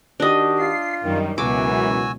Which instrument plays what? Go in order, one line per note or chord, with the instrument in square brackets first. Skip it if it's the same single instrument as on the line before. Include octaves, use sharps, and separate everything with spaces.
[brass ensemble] D#3 F#4 G4 [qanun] D4 D#5
[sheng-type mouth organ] F4 [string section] C7
[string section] F#2 G3 [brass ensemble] D#3
[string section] C#2 B2 [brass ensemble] F#2 E3 [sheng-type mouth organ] F#4 G#5 E6 [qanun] D6